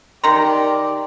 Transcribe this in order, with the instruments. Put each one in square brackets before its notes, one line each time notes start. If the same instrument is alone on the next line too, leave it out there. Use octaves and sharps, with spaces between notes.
[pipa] D#3 A#5 [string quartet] G4 D5 [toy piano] C6